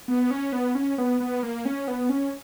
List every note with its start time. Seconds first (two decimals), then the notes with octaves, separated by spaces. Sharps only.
0.08 B3
0.31 C#4
0.52 B3
0.75 C#4
0.98 B3
1.20 B3
1.43 A#3
1.65 C#4
1.88 B3
2.09 C#4